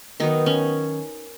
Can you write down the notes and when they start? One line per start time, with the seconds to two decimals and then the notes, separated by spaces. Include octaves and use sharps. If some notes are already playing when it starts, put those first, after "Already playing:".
0.20 D#3 F#3 B3 D#4
0.46 C#4